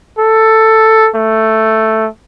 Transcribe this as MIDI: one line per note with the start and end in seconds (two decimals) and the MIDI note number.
0.19 1.10 69
1.15 2.08 57